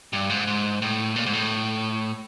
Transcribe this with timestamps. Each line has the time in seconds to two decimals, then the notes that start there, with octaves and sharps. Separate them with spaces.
0.13 G2
0.30 G#2
0.47 G#2
0.82 A2
1.16 A#2
1.26 G#2
1.33 A2